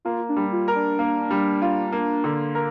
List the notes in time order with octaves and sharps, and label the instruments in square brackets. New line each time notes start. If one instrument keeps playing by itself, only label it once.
[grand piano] A#3 [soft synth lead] F4
[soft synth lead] D4
[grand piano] G3
[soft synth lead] F4
[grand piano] A#4
[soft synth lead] D4
[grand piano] A#3
G3
F4
A#3
D3
A#4